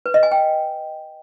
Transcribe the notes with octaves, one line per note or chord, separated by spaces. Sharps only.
B4
D#5
G#5
G5